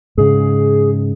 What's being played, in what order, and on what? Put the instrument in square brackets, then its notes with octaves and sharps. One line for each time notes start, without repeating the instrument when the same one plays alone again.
[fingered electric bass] G#2 C#3 [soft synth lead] G#4